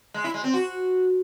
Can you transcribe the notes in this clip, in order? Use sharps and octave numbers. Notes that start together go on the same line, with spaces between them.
G#3
E4
G#3
C4
F#4